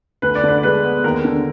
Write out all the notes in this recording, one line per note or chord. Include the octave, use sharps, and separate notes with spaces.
D2 B4
D5
D3 B4
D5
G#3 B4
B3
D#2 A#4
D3